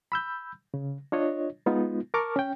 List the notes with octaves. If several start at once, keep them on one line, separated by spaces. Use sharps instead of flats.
B5 E6 G6
C#3
D4 F4 C#5 D#5
G#3 B3 D#4 F4
A#4 A5 C#6 D6 F6
C#4 G5